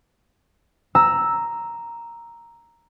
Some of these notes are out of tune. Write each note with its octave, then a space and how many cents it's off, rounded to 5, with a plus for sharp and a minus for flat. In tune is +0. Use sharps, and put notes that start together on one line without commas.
A#5 +0 E6 +0